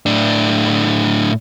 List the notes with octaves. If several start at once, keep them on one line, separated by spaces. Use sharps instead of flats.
A2 D4